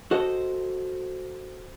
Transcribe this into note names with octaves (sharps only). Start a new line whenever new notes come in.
F#4 A4 C5 D#5